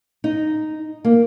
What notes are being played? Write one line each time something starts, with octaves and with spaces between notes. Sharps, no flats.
D#4
A#3